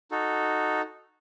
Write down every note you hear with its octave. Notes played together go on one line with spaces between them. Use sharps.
D#4 F#4 A4